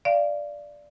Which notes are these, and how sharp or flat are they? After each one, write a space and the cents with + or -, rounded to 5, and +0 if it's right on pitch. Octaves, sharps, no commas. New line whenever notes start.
D5 +0 F5 -25